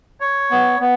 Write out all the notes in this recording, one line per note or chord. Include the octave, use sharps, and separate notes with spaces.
C#5
B3
B3